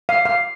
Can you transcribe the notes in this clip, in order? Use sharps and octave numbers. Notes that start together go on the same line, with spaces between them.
F5
F5